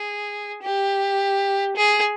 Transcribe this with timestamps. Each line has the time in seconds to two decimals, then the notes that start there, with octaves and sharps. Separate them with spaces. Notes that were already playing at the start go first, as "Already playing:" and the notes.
Already playing: G#4
0.62 G4
1.76 G#4